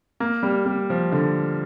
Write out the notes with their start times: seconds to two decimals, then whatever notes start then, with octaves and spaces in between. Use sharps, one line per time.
0.20 A#3
0.43 G3
0.66 G3
0.90 F3
1.12 D3